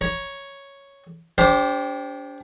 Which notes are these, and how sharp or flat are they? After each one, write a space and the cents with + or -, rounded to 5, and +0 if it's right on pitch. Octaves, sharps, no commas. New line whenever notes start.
C#5 +0 A#5 +30
D4 -40 G4 +5 C5 +0